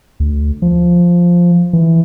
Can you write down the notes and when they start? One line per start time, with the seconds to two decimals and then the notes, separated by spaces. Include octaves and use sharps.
0.20 D2
0.62 F3
1.73 E3